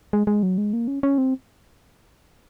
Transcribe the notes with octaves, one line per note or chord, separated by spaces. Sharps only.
G#3
G#3
F#3
G#3
A#3
C#4
C#4
C4